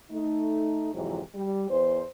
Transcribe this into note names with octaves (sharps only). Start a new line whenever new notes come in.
A3 D#4
F2 G#2 C3 E3 F#3
G3
E2 C5